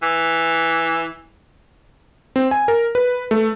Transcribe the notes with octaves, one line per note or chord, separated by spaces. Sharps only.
E3
C4
G#5
A#4
B4
A3